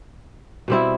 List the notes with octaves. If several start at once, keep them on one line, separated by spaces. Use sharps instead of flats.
B2 G3 C4 E4